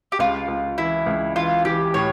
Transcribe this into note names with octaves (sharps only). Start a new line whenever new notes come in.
G4
C#2 F4
C#2
E3 E4
C#2
E3 F4
E3 G4
A2 C#5